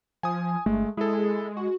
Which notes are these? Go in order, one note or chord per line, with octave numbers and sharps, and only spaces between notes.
F3 G#5 D#6
G1 G#3 A3
G#3 E4 G#4 A4
F#4